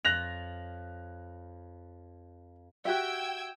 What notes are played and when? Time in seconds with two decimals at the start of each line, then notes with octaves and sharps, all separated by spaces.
0.05 F2 C#5 F#6 A6 A#6 F7
2.85 F#4 G4 E5 G5 E6 G#6